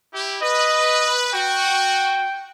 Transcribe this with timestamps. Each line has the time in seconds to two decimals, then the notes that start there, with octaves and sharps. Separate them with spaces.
0.13 E4 G4
0.42 B4 D#5
1.34 F#4 G5